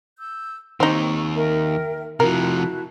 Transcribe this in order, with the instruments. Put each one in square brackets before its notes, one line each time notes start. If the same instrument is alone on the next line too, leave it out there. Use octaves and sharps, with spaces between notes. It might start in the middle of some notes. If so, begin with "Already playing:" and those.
[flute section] E6 G6
[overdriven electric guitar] D#2 D#3 [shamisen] C4 D#4 [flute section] C#6
[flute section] A#4 E5 G5
[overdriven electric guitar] C3 F3 [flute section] E4 F#4 A5 [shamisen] A#4